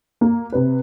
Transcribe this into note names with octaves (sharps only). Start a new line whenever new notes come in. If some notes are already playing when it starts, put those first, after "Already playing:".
A#3
C3 B4